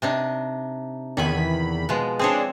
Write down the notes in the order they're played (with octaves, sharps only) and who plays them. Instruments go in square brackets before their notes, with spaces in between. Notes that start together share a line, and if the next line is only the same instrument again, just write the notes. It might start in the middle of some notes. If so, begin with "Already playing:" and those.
[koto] C3 D4 D#4
[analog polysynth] E2 B5 [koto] D#3 G#5
[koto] B2 F3 G#3
[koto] C4 C5 C#5 [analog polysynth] D4 G#4